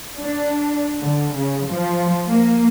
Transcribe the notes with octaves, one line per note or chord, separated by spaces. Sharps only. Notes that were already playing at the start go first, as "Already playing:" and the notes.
D4
D3
C#3
F3
A#3